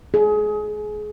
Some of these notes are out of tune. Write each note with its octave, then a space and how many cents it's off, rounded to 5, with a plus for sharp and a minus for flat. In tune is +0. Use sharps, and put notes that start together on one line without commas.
G#4 +25